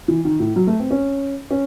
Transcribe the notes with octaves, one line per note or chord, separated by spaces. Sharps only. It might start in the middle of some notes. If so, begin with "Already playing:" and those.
E3
D#3
A2
F#3
A3
C4
C#4
C#4